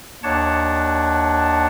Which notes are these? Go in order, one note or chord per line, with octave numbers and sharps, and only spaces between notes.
D#2 D4 C#5 F#5 A5